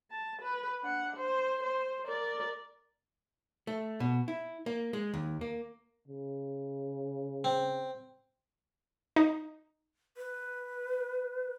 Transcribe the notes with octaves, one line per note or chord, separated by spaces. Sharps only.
A5
B4
D4 F#5
C5
C5
A#4 D5
A3
B2
E4
A#3
G#3
D#2
A#3
C#3
C4
D#4
B4